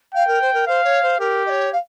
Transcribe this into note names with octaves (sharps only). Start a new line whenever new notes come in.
F5 G5
A#4
C5
A#4
C5 F5
C#5
C5
G4 A#4
D#5
C#5
F5